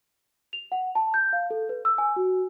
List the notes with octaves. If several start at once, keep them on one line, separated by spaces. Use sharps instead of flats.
F7
F#5
A5
G6
F5
A4
B4
E6
G#5
F#4